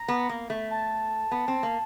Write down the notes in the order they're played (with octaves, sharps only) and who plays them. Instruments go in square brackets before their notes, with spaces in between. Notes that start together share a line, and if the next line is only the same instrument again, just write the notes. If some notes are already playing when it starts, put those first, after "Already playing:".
Already playing: [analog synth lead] A#5
[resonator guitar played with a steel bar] B3
A#3
A3
[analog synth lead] A5
[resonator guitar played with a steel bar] B3
C4
A#3